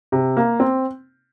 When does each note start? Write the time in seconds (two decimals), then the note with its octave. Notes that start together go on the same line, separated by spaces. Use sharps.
0.12 C3
0.37 A#3
0.60 C4